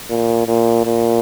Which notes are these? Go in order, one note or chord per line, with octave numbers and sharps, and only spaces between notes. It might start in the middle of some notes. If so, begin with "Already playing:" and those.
A#2
A#2
A#2